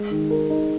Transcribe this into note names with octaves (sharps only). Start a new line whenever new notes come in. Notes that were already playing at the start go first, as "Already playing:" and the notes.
Already playing: G#3
D#3
A#4
D#4